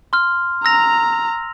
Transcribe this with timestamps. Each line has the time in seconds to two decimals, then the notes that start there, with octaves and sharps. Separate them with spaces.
0.13 C6 F6
0.65 A#5 E6 A#6 F7